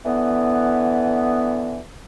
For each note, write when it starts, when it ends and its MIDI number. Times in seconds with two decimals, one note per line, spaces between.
0.05 1.81 50
0.05 1.81 52
0.05 1.81 59